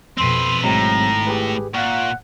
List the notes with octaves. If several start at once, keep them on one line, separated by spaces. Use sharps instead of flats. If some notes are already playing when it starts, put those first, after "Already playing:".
F2 B2 C4 B4 C6
G#1 A2 F#3 G#3 C4 A#5
G4 G#4 B4
A#2 F5 F#5 C#6